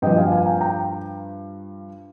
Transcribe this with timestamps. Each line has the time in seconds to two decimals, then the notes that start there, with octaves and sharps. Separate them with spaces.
0.02 G2 D#5 G5
0.06 F3
0.17 F5 G#5
0.32 F5 G#5
0.46 G5 A#5
0.61 G5 A#5